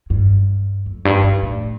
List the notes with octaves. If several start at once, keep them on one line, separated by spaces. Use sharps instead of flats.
G2
F2
G2
G2
A2